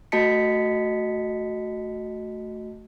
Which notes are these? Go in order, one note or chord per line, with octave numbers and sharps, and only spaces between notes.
A3 F#4 D#5 A5 B6 C#7